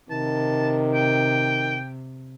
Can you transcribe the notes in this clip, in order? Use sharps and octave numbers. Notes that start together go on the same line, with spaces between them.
C3 D#3 A5
G5